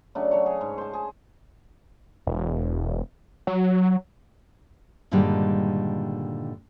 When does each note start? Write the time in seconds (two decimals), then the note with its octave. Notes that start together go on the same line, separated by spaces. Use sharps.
0.15 C#3 F#3 A3 D4
0.31 F#3 A4 C#5
0.46 G#4
0.61 G#2
0.78 C5 A5
0.93 G#4
2.27 E1
3.47 F#3
5.11 G2 A#2 D3 D#3 G3 G#3